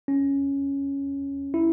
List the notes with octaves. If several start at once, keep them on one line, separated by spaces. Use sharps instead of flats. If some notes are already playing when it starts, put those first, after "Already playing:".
C#4
E4